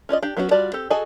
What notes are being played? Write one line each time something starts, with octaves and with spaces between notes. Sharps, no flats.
C#4 F4 D5 D#5
D4 G4 G5
F#3 B3 C#4 E4 F#4
G3 F4 F#4 D5 A5
C4 G4 A4
F#4 G#4 A4 D#5 G#5